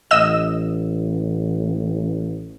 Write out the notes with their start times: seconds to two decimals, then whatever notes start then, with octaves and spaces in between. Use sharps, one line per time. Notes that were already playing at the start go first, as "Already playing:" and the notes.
0.11 A1 D#5 E6 E7